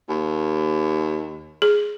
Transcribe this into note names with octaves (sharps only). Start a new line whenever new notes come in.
D#2
G#4